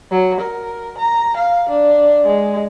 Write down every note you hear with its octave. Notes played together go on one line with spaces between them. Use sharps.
F#3
A#4
A#5
F5
D4
G#3